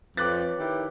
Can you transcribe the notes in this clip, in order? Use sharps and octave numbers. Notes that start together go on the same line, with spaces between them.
F2 B4 C#5 D6 F#6 A6
D#3 E4 G4